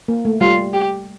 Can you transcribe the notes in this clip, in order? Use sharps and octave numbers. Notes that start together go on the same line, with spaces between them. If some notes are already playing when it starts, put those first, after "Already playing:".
A#3
A3
G3 F4
G4